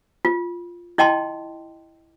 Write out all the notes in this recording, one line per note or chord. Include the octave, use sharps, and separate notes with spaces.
F4
E4 D#5 G5 A5 C6